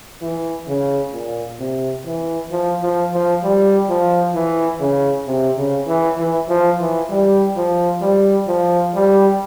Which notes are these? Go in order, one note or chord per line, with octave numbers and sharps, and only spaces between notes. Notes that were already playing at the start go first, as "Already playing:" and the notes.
E3
C#3
A#2
C3
E3
F3
F3
F3
G3
F3
E3
C#3
C3
C#3
E3
E3
F3
E3
G3
F3
G3
F3
G3